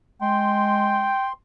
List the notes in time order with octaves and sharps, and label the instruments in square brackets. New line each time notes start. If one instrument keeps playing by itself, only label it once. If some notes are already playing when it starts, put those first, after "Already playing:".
[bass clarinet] G#3 [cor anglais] G5 [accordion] C6